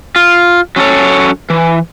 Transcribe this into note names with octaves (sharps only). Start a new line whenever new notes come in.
F4
F#3 C#4 G4 A4 C#5
E3